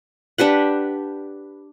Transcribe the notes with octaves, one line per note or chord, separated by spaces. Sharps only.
D4 G4 B4 F#5